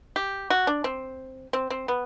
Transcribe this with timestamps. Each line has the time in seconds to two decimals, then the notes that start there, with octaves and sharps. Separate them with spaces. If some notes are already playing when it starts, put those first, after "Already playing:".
0.16 G4
0.50 F#4
0.67 D4
0.84 C4
1.53 C4
1.70 C4
1.88 B3